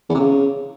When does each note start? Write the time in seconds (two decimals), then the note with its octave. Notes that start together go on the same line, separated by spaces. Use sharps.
0.09 E2
0.15 C3
0.20 C#3